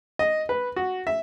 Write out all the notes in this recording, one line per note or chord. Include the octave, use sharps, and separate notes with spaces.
D#5
B4
F#4
E5